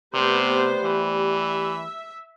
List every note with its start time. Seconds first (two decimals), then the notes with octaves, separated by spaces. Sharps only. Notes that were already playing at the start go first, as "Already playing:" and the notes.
0.14 C3 G3 A3 B3 G4 C5
0.84 E3
1.33 E5